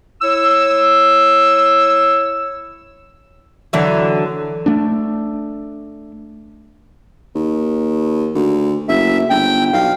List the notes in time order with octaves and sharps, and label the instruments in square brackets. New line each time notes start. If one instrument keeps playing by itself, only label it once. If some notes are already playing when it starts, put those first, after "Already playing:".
[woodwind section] E4 C#5 E6
[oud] D3 E3 F#3
[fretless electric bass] A3 D4
[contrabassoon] D#2
D2
[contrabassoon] F#1 [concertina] E5
[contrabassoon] G1 [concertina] G5
[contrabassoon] B1 [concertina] F5